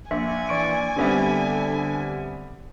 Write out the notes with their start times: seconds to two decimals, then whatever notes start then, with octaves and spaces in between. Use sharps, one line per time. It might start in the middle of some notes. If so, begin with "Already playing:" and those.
0.11 A#1 E5 G#5
0.49 E3 D4 D5 C#6 D7
0.96 D3 G3 B3 C4 G4 E5